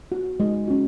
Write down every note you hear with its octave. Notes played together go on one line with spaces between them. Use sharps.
F#4
G#3
C#4 F#4